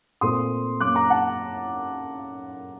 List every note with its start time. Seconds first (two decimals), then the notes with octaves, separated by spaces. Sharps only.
0.21 A#2 A3 C4 C6 D#6
0.80 F#2 F#3 A#3 D6 F#6
0.95 A#5 D6
1.10 F#5 A5